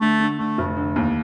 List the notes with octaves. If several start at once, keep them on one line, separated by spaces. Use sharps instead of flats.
D3 A3
D3
D3 A3
F1
D3
D#2